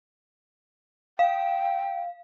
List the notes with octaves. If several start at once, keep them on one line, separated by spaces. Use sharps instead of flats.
F5 G5